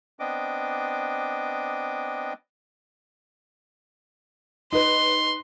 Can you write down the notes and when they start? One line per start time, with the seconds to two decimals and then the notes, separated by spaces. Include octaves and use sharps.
0.20 B3 C4 D4 D#5 D6
4.73 D#4 B4 C6